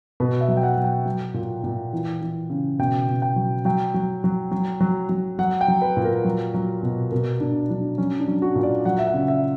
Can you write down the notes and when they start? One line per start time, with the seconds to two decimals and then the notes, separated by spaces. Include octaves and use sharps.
0.20 B2 B4
0.41 E5
0.48 F#3
0.57 G5
0.63 F#5
0.76 F#3
0.84 G5
1.06 F#3
1.34 A#2
1.64 A#2
1.93 E3
2.22 E3
2.50 C#3
2.79 B2 G5
3.08 B2
3.22 G5
3.36 F#3
3.65 F#3 G5
3.94 F#3
4.24 F#3
4.52 F#3
4.80 F#3
5.09 F#3
5.39 F#3 F#5
5.61 G5
5.68 F#3
5.82 B4
5.97 A#2
6.04 A#4
6.25 F#3
6.54 F#3
6.83 B2
7.11 B2 A#4
7.40 B2 D4
7.70 F#3 D4
7.98 F#3 C#4
8.19 D4
8.28 F#3
8.42 F#4
8.55 A#2
8.63 D5
8.85 F#3 F#5
8.99 E5
9.07 F#5
9.14 C#3
9.28 E5